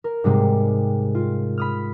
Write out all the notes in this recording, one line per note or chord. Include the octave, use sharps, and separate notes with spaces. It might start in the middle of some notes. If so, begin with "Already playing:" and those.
A#4
G#2 C3 G3 G#3
F4
B5 D#6 F6